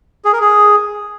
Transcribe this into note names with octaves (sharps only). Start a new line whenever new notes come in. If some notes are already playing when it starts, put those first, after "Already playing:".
G#4
A#4
G#4